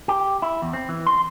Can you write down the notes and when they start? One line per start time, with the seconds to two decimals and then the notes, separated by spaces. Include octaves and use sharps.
0.08 G4
0.42 E4
0.62 E2
0.73 C4
0.89 E3
1.07 C6